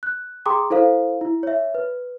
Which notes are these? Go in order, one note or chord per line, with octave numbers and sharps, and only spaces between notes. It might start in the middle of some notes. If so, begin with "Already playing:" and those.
F#6
G#4 G5 A#5 C6 D6 D#6
E4 A4 C5 F5
E4
C#5 E5
B4